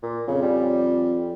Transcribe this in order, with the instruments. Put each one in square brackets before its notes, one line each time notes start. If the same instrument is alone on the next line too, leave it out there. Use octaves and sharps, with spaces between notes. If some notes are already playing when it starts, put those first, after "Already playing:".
[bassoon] A#2
[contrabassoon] F2 [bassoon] C#3
[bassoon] G3